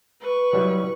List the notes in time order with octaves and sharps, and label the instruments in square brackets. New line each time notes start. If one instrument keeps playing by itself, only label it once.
[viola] B4 C#6
[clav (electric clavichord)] F#3 G3 E4